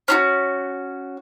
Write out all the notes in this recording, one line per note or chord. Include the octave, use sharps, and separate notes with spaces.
C#4 D4 F#4